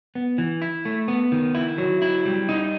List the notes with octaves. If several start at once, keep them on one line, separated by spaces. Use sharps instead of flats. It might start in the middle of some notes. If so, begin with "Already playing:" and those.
B3
E3
E4
A3
B3
D#3
E4
F#3
E4
G3
D#4